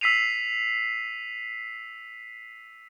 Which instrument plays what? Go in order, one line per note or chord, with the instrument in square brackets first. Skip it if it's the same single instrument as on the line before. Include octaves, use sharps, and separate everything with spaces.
[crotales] E6 B6 C7 D#7 F7